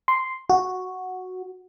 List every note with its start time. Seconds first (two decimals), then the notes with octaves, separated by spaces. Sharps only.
0.08 C6
0.50 F#4